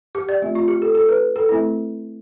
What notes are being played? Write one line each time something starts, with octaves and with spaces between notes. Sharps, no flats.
G4
D5
A3 C4 F4
F4
G4
A4
A4
B4
A4
A3 C4 E4